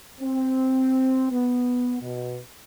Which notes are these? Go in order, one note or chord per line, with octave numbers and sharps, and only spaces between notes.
C4
B3
B2